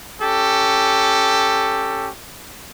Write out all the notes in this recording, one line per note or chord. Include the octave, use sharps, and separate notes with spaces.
C#4 G4 A4